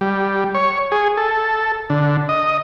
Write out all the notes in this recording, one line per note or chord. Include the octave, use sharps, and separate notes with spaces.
G3
C#5
G#4
A4
D3
D#5